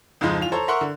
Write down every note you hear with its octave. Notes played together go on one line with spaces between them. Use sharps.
F2 G#2 C#3 F3 G#3 D#4
E2 F4 F7
A4 C5 C#5 A#5
A#4 E5 F#5 C6 C#6 F#6
D3